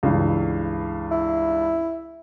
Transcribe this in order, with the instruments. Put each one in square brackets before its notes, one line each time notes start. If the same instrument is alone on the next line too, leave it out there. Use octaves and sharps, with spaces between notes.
[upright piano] C#2 G2 E3
[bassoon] E4